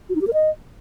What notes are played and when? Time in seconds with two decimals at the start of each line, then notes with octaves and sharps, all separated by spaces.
0.09 F#4
0.15 D#4
0.21 G4
0.27 A#4
0.33 D#5